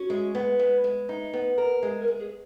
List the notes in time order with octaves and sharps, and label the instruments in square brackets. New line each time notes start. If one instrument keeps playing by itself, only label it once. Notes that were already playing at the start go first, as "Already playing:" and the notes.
Already playing: [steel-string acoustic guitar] C#4 [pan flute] F#4
[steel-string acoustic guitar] G#3
B3
G#3
G#3
D#4
B3
A#4
[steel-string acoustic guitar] G#3 [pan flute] G#4
[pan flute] A#4
[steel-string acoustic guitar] G#3
[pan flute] G#4